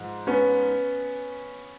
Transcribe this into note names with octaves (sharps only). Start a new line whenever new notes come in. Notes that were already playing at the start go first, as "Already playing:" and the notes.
Already playing: G#2 F3
B3 C#4